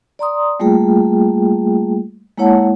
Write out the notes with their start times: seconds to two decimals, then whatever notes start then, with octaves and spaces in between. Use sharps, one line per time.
0.19 D5 A#5 C6 D#6
0.60 G3 A3 A#3 F4 G#4 G5
2.38 G#3 A#3 E4 C#5 F#5 A5